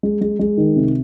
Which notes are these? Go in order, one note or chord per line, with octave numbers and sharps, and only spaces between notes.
G#3
G#3
G#3
D#3
C3